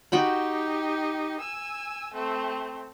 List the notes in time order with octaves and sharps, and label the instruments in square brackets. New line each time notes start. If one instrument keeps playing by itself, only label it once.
[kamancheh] D#4 G4 [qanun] F#4 G5 B5
[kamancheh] G#5 E6
A3 C4